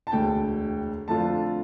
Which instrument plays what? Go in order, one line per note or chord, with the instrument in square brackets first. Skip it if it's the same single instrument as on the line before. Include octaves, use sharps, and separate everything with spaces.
[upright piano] A5
E1 D2 D3 G5
F2 D3 A3 D4 F4 A5